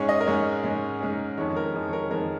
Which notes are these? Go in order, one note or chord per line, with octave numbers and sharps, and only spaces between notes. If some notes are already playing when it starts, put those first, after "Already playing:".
Already playing: G#2 G#3 C#4 C#5
D#5
A#4
G#2 G#3 C#4 C#5
G#2 G#3 C#4
G#2 G#3 C#4
F2 D#3 G#3 C#5
A#4
F2 D#3 G#3
C#5
A#4
F2 D#3 G#3 A#4